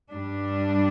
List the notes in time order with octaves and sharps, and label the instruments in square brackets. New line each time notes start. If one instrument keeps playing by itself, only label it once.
[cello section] G2 G3 D4